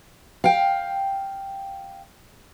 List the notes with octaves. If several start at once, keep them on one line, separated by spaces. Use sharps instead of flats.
F5 G5